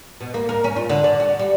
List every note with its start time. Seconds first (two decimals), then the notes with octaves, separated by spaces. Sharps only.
0.21 B2
0.34 A#3
0.49 A#4
0.64 C#4
0.76 F4
0.89 D3
1.04 D5
1.20 F#4
1.39 G3